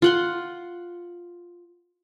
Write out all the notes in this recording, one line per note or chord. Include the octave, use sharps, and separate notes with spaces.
F4 F#5 C6